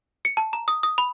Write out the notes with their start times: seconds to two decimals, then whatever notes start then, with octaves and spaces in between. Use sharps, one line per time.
0.25 C#7
0.37 A5
0.53 A#5
0.68 D#6
0.83 D#6
0.98 B5